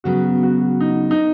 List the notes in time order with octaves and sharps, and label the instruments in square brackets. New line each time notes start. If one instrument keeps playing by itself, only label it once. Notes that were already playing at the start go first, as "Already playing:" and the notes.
[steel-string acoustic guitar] C#3 F#3 B3 [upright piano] F#4
[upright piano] F#4
D#4
D#4